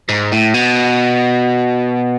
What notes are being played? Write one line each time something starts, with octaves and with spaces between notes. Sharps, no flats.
G#2
A2
B2